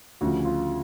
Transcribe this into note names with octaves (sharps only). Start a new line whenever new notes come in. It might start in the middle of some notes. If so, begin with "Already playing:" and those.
D2 C#3 F3 F#4
F4